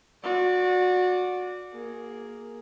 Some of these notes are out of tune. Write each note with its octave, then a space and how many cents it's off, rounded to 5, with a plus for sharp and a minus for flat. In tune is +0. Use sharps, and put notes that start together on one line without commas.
F#4 -25 D5 -5
A#3 +0 G#4 +0